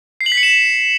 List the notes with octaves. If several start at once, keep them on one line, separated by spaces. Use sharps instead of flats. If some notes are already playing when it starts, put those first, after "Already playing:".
C7
F#7
B6
C#7
E7